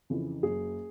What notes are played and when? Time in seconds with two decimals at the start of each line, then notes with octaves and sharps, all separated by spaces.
0.10 F2 C#3 E3
0.43 F#1 G#4